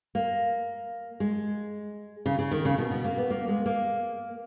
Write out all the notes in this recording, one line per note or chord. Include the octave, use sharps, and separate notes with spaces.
A#3
G#3
C#3
C#3
D#3
C#3
B2
B2
A#3
B3
A#3
G#3
A#3